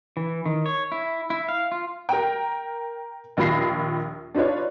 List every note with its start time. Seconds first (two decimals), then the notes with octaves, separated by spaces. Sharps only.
0.17 E3
0.46 D#3
0.66 C#5
0.92 E4
1.30 E4
1.49 F5
1.72 F4
2.09 A#4 G5
3.37 A#1 D#2 F4 B5 A#6 C7
4.34 D4 D#4 F4 B4 C#5